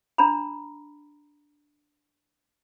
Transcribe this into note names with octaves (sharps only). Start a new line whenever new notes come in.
D4 A#5 B5